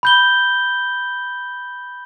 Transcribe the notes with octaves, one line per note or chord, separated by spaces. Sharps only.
B5 G6 G7